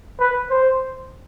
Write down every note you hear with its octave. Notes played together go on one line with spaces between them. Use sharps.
B4
C5